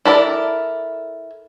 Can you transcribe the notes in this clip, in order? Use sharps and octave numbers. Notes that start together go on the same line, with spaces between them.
E4 A4 A#4 D5